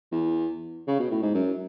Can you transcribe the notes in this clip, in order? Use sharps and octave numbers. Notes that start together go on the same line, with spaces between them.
E2
C#3
B2
A2
G#2
F#2